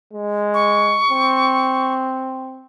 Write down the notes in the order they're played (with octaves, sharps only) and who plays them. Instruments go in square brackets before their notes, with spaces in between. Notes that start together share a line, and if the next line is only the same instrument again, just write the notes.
[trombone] G#3
[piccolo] C#6
[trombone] C4